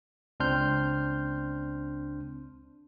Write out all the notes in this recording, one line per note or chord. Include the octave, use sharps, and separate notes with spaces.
C#2 C4 D4 C6 F6 G6